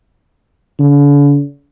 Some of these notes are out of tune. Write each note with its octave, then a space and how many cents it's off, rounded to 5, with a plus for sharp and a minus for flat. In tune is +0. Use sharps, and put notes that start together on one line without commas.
D3 -45